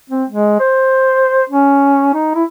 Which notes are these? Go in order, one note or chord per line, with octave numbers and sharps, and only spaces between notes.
C4
G#3
C5
C#4
D#4
E4